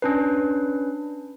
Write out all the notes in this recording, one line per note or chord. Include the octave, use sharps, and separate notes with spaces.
C#4 D4 B4